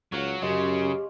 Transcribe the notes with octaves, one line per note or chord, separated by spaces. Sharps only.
C#2 F#3 C#5 F5
F#2 C#3 G#3 G4